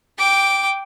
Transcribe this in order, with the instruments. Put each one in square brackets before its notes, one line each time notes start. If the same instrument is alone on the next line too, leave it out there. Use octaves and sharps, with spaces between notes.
[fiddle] G5 D6